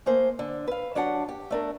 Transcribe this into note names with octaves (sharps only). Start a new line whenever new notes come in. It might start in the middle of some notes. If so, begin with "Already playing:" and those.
A3 A#3 G#4 C5
D3
B4 F5
F#3 D4 G4 F#5 A5
G4
A3 D4 A#4